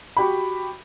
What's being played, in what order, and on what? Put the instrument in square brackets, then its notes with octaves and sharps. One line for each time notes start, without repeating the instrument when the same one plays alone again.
[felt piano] F#4 G4 B5